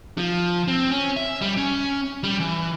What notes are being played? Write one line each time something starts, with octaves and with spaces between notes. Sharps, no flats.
F3
C4
C#4
E5
G3
C#4
G3
E3